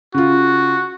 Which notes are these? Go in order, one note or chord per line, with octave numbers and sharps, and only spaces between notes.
C#3 F4 F#4